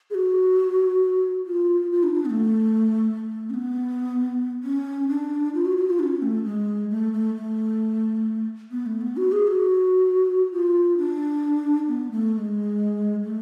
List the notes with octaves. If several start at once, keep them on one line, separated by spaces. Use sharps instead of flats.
G#4
F#4
F4
F4
D4
D4
B3
A3
A3
C#4
B3
C#4
D4
F4
F#4
F#4
F4
D4
C#4
A3
G#3
A3
A3
A3
B3
A3
B3
F#4
G#4
F#4
F4
D4
B3
A3
A3
G#3
A3